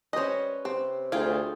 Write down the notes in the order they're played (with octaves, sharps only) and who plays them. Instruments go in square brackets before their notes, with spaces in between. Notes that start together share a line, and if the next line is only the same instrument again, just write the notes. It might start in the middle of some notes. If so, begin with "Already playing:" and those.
[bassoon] G3 [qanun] C#4 B4 [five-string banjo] C5 D#5
[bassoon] C3 [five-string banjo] C4
[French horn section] D2 [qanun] F4 G#4 G5 [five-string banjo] F5